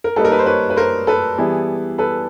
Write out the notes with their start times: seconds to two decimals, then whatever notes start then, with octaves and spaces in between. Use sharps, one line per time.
0.04 A#4
0.16 G3 A#3 D#4 A4 B4
0.25 A#4
0.32 B4
0.39 C5
0.46 B4 C#5
0.70 B4
0.76 A#4 C5
1.07 A4 B4
1.38 E3 G3 B3 E4 G#4
1.98 A4 B4